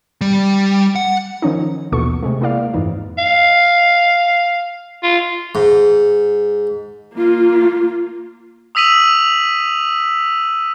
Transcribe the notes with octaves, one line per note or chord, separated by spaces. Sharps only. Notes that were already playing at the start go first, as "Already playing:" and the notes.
G3
F#5
D#3 F3 C#4 D#4
A#1 D#2 B2 E3 A4 C#6
C3 G#3 A3
G#3 A#3 E4 D5 F5
F2 G#2 E3 D#4
F5
F4
G#2
A#3 F4
D#6 E6 B6 D#7 F#7